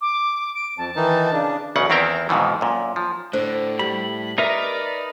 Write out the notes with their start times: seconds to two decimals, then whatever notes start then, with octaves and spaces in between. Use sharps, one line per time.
0.01 D6
0.55 D7
0.78 F2 A5
0.96 D#3 E3 D#4
1.32 C#3 D4
1.76 B1 E2 C#3 F#5
1.90 E2 D#3 C4 E4 A#4 G5
2.29 F2 G#2 B2 D#3 E3
2.61 F#2 A#2
2.96 F3
3.33 A2 D3 C5
3.79 G3 B5
4.38 D#4 A#4 B4 D5 E5